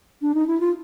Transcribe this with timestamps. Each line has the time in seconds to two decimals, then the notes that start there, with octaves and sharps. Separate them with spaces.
0.22 D4
0.35 D#4
0.47 E4
0.60 F4